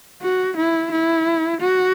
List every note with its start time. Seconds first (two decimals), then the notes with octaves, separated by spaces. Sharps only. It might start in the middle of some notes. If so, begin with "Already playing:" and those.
0.21 F#4
0.57 E4
0.91 E4
1.61 F#4